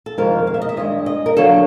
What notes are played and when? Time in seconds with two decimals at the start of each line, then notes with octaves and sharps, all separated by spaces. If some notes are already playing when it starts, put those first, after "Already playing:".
0.06 A4
0.18 F2 C3 D#3 G#3 C4 A#4
0.47 F5
0.54 E5
0.62 D#5
0.69 E5
0.77 G2 D#3 G#3 D#5
1.06 D#5
1.26 A#4
1.36 D3 F#3 A#3 D4 A4